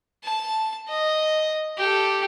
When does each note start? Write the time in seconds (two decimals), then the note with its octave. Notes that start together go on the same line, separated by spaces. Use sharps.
0.24 A5
0.89 D#5
1.78 G4 A4